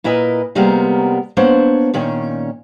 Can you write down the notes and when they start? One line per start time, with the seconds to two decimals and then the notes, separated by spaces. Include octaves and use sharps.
0.04 A#2 E4 A#4 B4 D#5
0.55 C3 G3 G#3 A#3 B3 A#4
1.37 A#3 B3 D4 C5 C#5
1.94 A#2 D#3 C#4